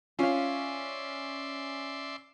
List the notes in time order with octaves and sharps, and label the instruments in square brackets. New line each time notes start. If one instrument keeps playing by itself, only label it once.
[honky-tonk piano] C#4 [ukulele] F4 F5 [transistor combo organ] D5 E5 C6